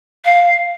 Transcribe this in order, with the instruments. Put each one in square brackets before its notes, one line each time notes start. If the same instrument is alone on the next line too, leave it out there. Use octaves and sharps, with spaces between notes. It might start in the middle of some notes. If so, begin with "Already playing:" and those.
[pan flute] F5